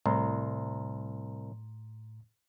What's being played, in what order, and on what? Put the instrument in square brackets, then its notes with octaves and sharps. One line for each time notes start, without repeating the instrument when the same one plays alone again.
[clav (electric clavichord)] C2 [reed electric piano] A2 A#5 C6